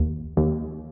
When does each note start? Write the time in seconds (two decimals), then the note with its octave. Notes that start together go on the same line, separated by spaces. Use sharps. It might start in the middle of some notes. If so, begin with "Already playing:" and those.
Already playing: D#2
0.37 D#2